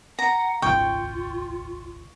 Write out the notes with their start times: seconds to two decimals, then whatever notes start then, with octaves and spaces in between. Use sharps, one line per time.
0.19 F#5 A#5
0.62 D#1 G#1 C#2 F4 G5 C#6